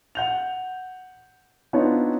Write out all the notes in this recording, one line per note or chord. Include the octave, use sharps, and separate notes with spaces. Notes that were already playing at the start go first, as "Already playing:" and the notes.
F#5 G6 F7
B3 C4 D4 D#4 F4 C#5